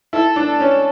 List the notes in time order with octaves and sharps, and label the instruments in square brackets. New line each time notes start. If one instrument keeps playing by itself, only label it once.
[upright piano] E4 [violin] A4
[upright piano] D4
[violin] A4
[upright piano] C#4